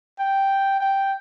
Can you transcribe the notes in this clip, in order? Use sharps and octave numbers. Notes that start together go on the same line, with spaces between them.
G5
G5